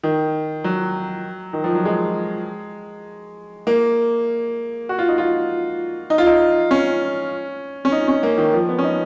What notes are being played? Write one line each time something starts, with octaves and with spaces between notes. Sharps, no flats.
D#3
F#3
D#3
F3
F#3
G#3
A#3
F#4
F4
D#4
F4
D#4
F4
D#4
C#4
C#4
D#4
C#4
A#3
D#3
F3
B3
C#4
D#4